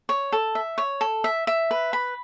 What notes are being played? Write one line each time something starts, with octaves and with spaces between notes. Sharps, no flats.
C#5
A4
E5
C#5
A4
E5
E5
B4
B5